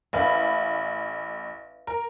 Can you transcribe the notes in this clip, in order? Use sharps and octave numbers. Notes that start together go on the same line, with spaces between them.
A1 B4 E5 F5 B5
A#4